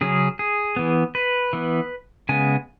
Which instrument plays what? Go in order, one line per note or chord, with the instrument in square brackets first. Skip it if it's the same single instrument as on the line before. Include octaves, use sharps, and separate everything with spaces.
[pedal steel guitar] C#3 F#3 C#4 G#4
G#4
E3 B3
B4
E3 B3
C#3 G#3 B3 G#5